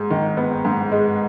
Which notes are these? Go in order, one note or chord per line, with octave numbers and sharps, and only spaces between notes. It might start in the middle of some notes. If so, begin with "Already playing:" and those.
Already playing: G#2 G#3
D#3
B3
G#2
G#3